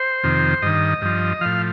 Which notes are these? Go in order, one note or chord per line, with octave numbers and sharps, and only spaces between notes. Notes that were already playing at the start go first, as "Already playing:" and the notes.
Already playing: C5
F2 C3 D#3
G2 D#3 D#5
G2 F3
A2 F3 F5